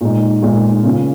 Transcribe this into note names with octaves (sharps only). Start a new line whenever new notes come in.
A#2 G#3 D#4
A#2 G#3 D#4
C#3 A#3 C#4 F4